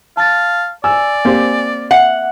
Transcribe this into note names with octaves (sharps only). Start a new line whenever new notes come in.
F5 A5 A6
D5 G#5 E6
A#3 C4 G4
E5 F#5